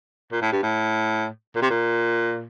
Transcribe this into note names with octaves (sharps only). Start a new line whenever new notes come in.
A#2
A2
G2
A2
A#2
C3
A#2